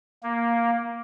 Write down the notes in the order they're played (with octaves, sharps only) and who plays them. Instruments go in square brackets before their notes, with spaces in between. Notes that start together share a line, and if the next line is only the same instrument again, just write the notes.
[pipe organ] A#3